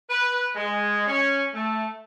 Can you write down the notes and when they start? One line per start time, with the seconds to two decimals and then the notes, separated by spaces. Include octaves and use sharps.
0.10 B4
0.55 G#3
1.07 C#4
1.54 A3